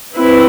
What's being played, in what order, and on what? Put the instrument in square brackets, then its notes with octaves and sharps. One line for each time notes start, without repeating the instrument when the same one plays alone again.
[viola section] C4 E4 B4